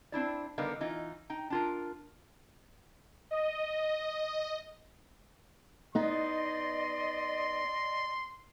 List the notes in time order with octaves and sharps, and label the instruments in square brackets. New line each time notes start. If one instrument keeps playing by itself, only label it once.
[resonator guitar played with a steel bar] C4 D4 E4 D5
D3 G3 B3 D#4 A#4 F5
E3 D#4 F4
D#4 G5
D4 F4 A#4
[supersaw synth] D#5
[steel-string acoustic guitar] B3 D#4 [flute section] D5 D#5 [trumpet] C6